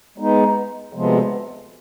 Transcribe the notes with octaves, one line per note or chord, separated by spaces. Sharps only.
G#3 B3 D#4
D2 C3 F3 G#3 B3